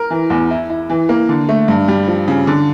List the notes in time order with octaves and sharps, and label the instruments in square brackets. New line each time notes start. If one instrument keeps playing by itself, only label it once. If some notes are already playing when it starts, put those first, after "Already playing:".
Already playing: [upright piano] A#4
E3
E2
E4
E4
E3
A#3
D3
A3
G2
G3
F3
C#3
D3